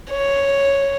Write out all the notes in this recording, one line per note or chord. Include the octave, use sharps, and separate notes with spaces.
C#5